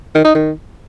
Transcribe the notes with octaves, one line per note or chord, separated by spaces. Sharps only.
D#3
D#4
D#3